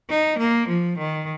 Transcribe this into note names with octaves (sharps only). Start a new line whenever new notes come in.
D#4
A#3
F3
D#3